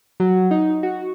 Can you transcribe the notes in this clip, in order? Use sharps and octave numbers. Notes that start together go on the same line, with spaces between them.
F#3
D#4
F#4